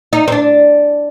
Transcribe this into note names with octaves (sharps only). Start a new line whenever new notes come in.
D#4
C4
D4